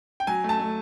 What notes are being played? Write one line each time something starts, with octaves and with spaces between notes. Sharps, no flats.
G5
F#3 G#5
A3
A5
A3